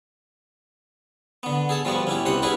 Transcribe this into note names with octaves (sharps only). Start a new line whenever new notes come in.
D3 B3
G#4 A4 A5
F3 G3 B3 F#4
C#4 E4 G4
C2 C3 B3 F#5 C6 D#6
C#4 D4 E4 F#4 G#4 B4